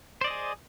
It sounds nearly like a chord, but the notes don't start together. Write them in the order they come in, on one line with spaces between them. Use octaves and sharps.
C5 D5 D#5 G#4